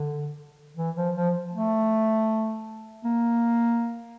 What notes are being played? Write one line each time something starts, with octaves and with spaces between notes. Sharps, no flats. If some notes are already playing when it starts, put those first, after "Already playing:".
Already playing: D3
E3
F3
F3
A3
A#3